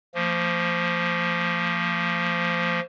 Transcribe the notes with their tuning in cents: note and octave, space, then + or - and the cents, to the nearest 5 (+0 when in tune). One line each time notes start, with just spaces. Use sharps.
F3 -10 A#3 -40